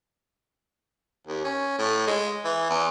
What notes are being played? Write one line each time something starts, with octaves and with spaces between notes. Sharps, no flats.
D#2
C#4
A2
G#3
E3
E2